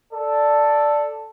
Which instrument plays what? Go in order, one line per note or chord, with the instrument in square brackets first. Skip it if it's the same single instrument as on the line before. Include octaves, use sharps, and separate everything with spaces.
[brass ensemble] A4 D5